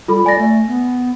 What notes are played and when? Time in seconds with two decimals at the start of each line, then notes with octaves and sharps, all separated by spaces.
0.08 G3 F4 A4 B5
0.26 D5 G#5 A#6
0.38 A3
0.67 B3